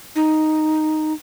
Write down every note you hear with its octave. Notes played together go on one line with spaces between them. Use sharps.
D#4